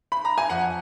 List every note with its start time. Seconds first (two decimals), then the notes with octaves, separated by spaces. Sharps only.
0.12 B5
0.25 A#5
0.38 G#5
0.50 F2 F#5